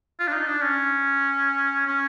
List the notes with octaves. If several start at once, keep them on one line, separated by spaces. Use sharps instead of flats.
F4
D4
D#4
D4
C#4
C#4